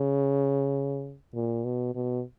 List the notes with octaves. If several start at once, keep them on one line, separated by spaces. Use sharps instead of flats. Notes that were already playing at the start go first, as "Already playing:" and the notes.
Already playing: C#3
A#2
B2
B2